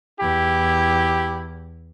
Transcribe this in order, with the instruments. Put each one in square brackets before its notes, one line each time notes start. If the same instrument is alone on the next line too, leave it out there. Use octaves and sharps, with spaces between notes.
[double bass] E2 [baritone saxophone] E4 [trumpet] G4